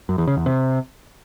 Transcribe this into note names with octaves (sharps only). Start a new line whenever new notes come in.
F#2
E2
C#3
E2
C3